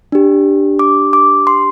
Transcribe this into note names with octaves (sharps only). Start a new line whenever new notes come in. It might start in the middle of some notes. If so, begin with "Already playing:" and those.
D4 G4
D6
D6
C6